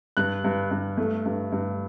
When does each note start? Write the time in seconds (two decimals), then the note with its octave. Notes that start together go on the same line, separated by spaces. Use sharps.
0.17 G2 F#6
0.44 G2
0.71 G2
0.97 A3
1.26 G2
1.52 G2